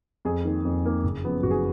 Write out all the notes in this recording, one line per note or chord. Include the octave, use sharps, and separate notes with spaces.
F2 G#4
D#3 A#3
F2
D#3 A#3
F#1
F#2 F3 B3
F#1 F#4
G#4